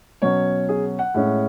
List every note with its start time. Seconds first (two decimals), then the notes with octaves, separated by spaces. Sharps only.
0.22 B2 F#3 C#4 C#5
0.69 G#4
0.99 F#5
1.14 A2 G#3 C#4